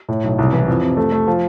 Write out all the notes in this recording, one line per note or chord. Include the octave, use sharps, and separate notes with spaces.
A2
B1
C2
E3
F2
C3
A3
A3
F3